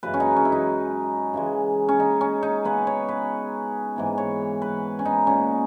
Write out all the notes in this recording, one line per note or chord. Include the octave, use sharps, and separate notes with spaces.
F#2 C#3 E3 G#3 B4
C#4
D#4
C#4
E4
D#4
C#3 E3 G#3
C#4
D#4
C#4
D#4
C#3 G#3 B3 B4
C#5
B4
G#2 E3 B3
C#5
B4
C#4
D#4
A#2 G#3 B3 C#4